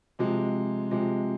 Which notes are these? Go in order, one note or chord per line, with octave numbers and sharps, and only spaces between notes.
C3 F3 G#3
C3 F3 G#3